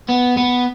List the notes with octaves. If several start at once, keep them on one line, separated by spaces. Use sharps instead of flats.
B3
B3